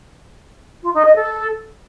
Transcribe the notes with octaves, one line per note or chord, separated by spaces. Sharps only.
F4
D#4
D#5
A4